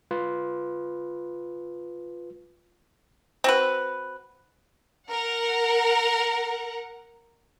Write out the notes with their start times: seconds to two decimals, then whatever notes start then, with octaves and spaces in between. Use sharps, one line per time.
0.11 F4 B4
3.44 C4 F#4 B4
5.10 A#4 F#5